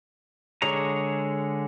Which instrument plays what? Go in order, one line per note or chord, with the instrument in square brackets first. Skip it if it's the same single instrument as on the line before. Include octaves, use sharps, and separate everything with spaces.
[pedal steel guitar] D3 G#3 G#4 C#5 A#5